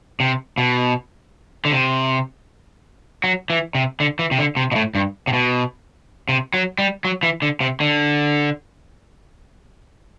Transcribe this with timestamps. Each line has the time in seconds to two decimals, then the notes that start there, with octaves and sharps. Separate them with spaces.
0.20 C3
0.58 B2
1.65 D3
1.71 C3
3.24 F#3
3.50 E3
3.75 C3
4.00 D3
4.19 E3
4.31 C3
4.39 D3
4.57 C3
4.72 B2
4.75 A2
4.95 G2
5.27 C3
5.33 B2
6.29 C3
6.54 F#3
6.79 G3
7.05 F#3
7.23 E3
7.42 D3
7.60 C3
7.80 D3